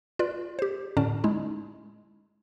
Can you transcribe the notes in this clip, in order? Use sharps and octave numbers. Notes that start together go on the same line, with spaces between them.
F4 B4 D5
G4 C5
A2 D3 C#4 D5 A5
G#3 D#4 E4